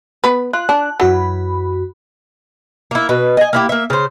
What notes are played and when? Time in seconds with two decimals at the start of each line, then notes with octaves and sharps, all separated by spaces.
0.24 B3 B4
0.53 F4 F#6
0.69 D4
1.00 F#2 E3 F#3 F#4 B5
2.91 A#3 E4
3.09 B2 B4
3.37 D#5 G#5
3.53 A#3 E4 G4
3.69 A#3 E5
3.90 C#3 C5